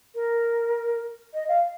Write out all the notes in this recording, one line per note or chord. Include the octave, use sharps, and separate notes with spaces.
A#4
D#5
F5